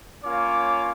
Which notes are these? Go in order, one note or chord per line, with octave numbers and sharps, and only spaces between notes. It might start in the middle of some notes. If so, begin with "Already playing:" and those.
A#3 C#4 F4 C#5 D6